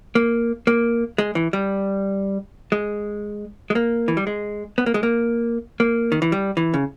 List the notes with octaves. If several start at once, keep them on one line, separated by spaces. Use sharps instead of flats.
A#3
A#3
G#3
E3
G3
G#3
G#3
A#3
E3
G3
G#3
B3
A#3
G#3
A#3
A#3
D#3
E3
G3
E3
C#3